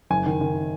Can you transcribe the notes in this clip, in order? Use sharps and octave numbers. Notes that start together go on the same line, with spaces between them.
F#1 G#5
D#3
D#3